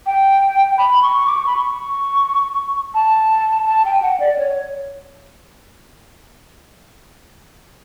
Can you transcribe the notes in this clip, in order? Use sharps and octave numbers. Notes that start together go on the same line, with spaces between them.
G5
B5
C#6
D6
C#6
B5
C#6
A5
A5
G5
F#5
D5
D5
C#5